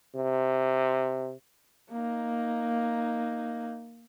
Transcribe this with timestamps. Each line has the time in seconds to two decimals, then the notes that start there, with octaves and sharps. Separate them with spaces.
0.16 C3
1.91 A#3 D#4